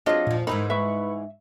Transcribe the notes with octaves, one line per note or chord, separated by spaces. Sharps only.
F#3 C4 D4 F4 G#4 D#5
E2 A#2 F3
G#2 E3 D#4 A#4 C5 B5
B4 E5 B5 C#6